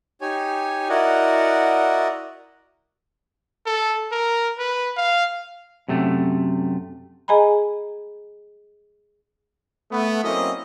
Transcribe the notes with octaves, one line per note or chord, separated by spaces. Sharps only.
D#4 G4 C#5 G#5
E4 F#4 A#4 D5 D#5 F#5
A4
A#4
B4
F5
F#2 C3 A3
G#4 D#5 G#5 A#5 B5
A3 B3
F#3 A#3 C4 C#4 E4 D#5